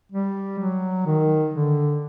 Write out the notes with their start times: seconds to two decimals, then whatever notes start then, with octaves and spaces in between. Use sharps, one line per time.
0.12 G3
0.59 F#3
1.06 D#3
1.54 D3